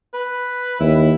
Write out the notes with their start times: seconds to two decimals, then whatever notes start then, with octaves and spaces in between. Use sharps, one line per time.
0.14 B4
0.80 D#2 E4